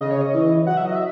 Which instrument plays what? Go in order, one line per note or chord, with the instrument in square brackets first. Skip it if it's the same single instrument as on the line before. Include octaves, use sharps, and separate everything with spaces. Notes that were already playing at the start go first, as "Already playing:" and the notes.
[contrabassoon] C#3 [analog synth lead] D#5
[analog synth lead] C#5
D#5
[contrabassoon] E3
[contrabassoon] F#3 [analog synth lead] F#5
[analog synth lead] E5
D#5
E5